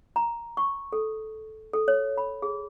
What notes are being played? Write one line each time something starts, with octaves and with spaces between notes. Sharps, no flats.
A#5
C#6
A4
A4
C#5
B5
G#4